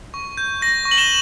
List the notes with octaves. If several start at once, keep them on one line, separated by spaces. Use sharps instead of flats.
C#6
G6
G6 A#6
C#6
F#7
E7 G7